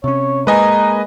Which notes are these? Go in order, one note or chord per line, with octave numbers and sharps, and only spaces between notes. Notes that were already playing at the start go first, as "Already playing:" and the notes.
C3 C#4 C#5
G#3 A#3 D#4 B4 D#5 G#5